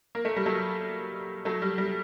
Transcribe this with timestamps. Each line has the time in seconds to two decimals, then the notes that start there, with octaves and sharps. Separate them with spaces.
0.15 A#3
0.25 A3
0.36 G3
0.46 F#3 A3
1.45 F#3 A3
1.62 G3
1.78 G3